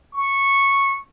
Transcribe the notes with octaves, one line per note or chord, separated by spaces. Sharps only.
C#6